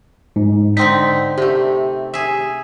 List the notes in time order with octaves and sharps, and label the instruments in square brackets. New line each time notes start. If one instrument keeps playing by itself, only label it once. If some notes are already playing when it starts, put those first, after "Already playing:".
[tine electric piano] G#2
[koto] D3 C4 D#4 [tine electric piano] B6
[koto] C3 A3 [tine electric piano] G4
[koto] G#4 E5